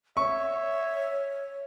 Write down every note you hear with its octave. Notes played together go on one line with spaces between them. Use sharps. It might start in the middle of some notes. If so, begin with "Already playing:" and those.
C#5 E5 C#6